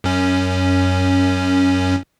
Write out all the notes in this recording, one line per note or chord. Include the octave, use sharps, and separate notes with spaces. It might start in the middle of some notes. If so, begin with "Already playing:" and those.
F#2 C#4